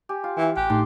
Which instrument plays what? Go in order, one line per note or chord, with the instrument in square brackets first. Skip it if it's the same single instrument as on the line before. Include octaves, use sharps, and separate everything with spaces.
[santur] G4 [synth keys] G#5
[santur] F4
[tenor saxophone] E3
[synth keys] A1 G#5 F#6 [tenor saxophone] G4
[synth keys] A2 A3 D#4 [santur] D4 C6 D6